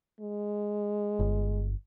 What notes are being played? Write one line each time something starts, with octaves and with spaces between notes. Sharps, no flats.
G#3
G1